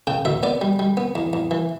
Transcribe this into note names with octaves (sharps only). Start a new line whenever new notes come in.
C#3 G5
D2 E5
B3 D5
G3
G3
B3
E2
E2
E3